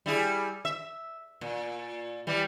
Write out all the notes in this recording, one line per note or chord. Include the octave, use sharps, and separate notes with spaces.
G3 E4 G#4
E5
A#2
E3 G3